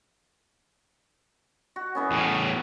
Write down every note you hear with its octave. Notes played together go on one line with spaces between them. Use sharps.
F#4
E3 B3 C#4
E2 A2